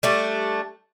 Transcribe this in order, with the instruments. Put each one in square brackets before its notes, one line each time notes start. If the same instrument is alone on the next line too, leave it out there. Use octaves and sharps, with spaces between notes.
[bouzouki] G3 A3 D4